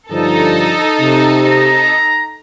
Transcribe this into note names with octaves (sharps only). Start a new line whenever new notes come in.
G2 D3 F3 D#4 A4
C3
A#5